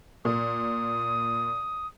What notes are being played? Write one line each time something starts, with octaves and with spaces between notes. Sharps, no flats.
A#2 D#6